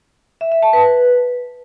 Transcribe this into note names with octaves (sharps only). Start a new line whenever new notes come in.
E5
E5
A5
B4